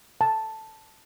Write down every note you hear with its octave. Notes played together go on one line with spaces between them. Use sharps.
A5